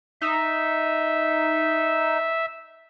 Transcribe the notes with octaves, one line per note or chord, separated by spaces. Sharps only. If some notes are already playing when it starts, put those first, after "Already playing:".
D#4 E5